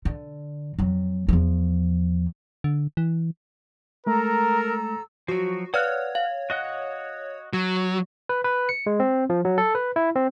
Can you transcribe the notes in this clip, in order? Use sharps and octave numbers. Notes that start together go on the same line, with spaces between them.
D3
F2 F#3
E2 F3
D3
E3
G#3 A3 A4 A#4 A#5 E6
F3 F#3 F#4
B4 C#5 D5 F5 F#5 F6 F#6
F5
F#4 D#5 F#5
F#3 F#4
B4
B4
C#7
G#3
C4
F3
F#3
A4
B4
E4
C4